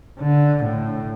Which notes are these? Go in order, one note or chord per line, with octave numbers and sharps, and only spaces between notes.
D3
A2